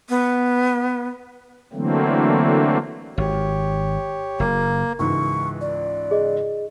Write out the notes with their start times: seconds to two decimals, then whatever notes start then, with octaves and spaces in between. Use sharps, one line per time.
0.09 B3
1.73 D3 E3 F#3 A3 A#3 C4
3.18 G#1 G4 C#5
4.40 F#1 A#3
4.99 C#2 G#2 E3 C#6
5.61 D5
6.11 G#4 D#5